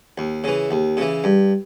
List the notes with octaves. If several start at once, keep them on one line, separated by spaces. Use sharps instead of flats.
D#2
C#3 E3
D#2
C#3 E3
G2